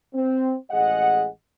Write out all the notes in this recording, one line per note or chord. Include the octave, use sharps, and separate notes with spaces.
C4
A1 G#3 G#4 D#5 F#5